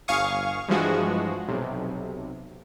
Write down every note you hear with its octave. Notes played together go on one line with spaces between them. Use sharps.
G1 F5 G#5 C#6 D#6
G2 E3 F3 G#3 F#4
B1 C3